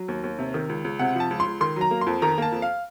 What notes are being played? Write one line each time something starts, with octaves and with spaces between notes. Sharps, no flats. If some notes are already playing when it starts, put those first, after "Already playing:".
Already playing: F#3
D#2
D#2
C3
D#3
C#2
C#2
C3 F#5
F3
A5
C#2
C6
C#2
D#3 C6
F#3 A#5
A#3
C6
F2
D#3 A#5
A#3 A5
F2
F5